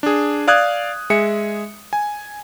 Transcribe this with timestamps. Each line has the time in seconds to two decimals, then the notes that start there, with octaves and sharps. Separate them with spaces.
0.03 D4 G#4
0.48 D5 F5 D#6 F#6 G#6
1.10 G#3 G#4 E5 C#7
1.93 G#5